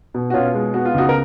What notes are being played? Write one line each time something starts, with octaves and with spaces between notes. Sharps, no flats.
B2
F#4
B2 C#4 F4
G#3
B3 F#4
F4
C#2 D#4 F#4
A#4